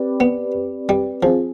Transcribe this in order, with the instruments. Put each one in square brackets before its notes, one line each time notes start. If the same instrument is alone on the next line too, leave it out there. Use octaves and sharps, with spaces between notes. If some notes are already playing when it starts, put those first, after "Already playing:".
Already playing: [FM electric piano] C4 G4 B4 D5
[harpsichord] B3
G3
[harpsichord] F3 [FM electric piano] C4 F4 G#4